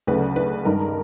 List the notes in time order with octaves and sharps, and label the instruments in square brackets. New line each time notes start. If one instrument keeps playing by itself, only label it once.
[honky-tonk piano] D2 C#3 F#3 A3 B4
B4
G2 D#3 G#3 A#4